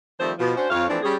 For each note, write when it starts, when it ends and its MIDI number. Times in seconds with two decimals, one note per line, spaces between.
0.20 0.32 51
0.20 0.32 53
0.20 0.32 55
0.20 0.32 57
0.20 0.32 60
0.20 0.32 72
0.39 0.53 47
0.39 0.53 53
0.56 0.67 61
0.56 0.67 62
0.56 0.67 66
0.56 0.67 72
0.71 0.85 41
0.71 0.85 73
0.71 0.85 77
0.88 0.99 52
0.88 0.99 53
0.88 0.99 57
0.88 0.99 60
0.88 0.99 62
1.03 1.15 55
1.03 1.15 61
1.03 1.15 68